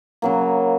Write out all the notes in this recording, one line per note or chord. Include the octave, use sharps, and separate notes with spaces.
C#3 F#3 A#3